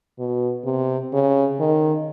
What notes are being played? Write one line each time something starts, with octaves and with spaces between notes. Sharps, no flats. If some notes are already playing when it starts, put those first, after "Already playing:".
B2
C3
C#3
D#3